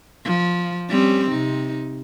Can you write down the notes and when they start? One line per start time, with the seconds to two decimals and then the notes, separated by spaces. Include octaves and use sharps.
0.25 F3
0.89 G3 C4 C#4
1.29 C3 D#4